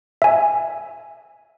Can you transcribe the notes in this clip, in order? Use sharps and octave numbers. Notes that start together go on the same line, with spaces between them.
E5 G#5